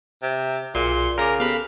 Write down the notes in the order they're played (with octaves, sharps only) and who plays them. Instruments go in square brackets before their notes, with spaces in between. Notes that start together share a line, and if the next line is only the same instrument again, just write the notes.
[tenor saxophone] C3
[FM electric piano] B1 G#4 C#7 [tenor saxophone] A#2 [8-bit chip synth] C6
[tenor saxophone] C#3 [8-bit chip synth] A#4 A#5 [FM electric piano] G#5 D6
[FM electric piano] B3 G4 A4 [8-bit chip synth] F5 B5